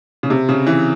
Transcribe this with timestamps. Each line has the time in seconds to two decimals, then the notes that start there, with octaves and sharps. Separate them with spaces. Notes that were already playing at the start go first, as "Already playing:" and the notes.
0.23 C#3
0.30 C3
0.49 C#3
0.67 E3